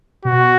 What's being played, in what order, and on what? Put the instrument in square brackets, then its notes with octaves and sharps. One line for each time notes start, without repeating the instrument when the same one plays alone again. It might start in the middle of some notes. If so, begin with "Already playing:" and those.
[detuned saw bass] B2 [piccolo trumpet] F#4